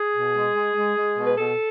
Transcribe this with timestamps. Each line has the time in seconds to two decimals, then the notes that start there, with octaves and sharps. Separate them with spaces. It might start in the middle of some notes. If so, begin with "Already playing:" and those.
Already playing: G#4
0.13 B2
0.34 G#3
0.55 G#3
0.76 G#3
0.97 G#3
1.18 B2
1.27 B4
1.37 B2 A4